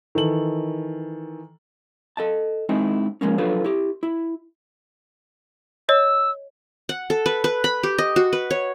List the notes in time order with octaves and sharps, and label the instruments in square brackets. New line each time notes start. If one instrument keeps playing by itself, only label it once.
[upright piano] D#3 E3 A4 F#7
[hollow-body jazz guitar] A4 D#5 A5
G#3 C4 D#4 E4
F3 G#3 A#3 C#4
F3 F#3 D4 F4 A4 B4
E4 G4
E4
[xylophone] C#5 D#5 [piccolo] E6
[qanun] F#5
A4
B4
B4
B5
G4
D#5
F#4
B4
C#5